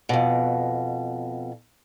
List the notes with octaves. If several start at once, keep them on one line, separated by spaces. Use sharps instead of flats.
F2 B2